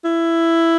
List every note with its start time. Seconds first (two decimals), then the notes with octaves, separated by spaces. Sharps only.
0.05 E4